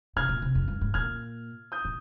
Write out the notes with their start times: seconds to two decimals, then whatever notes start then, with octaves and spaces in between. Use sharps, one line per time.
0.16 C3 F6 G#6
0.29 A#2
0.42 C3
0.55 F2
0.68 G2
0.81 G#2
0.94 A#2 F6 G#6
1.72 D#6 G6
1.85 A#2